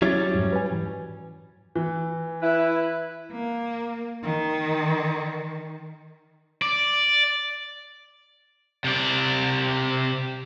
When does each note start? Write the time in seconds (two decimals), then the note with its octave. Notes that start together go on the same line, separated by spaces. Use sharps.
0.02 F#3 G3 C#4 E4 A6
0.35 F2 G#2
0.53 B4 G#5
0.71 G#2 E3
1.75 E3
2.41 E4 B4
3.31 A#3
4.23 D#3
6.62 D5
8.84 C3 D5